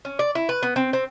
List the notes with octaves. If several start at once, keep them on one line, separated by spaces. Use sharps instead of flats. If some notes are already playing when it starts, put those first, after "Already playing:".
C#4
D5
E4
B4
B3
C4
C4